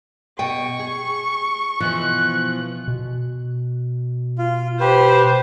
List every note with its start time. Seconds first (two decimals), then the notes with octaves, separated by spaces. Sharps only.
0.39 B2 D#5 G5 C#6
0.79 G#4
1.80 B2 E3 F3 F#6
2.88 B2
4.38 F4
4.80 G4 B4 C5